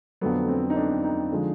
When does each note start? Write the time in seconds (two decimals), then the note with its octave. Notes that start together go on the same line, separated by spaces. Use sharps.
0.21 F2 D3 F#3 A3 B3
0.48 C4
0.70 D#4
0.76 D4
1.04 D#4
1.32 D3 F3 G#3